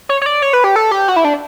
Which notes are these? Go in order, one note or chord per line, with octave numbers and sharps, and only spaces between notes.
C#5
C#5
D5
C#5
B4
G4
A4
G4
F#4
E4
D4